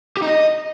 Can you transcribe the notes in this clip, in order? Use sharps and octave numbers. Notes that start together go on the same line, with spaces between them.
G4
D#4
D#5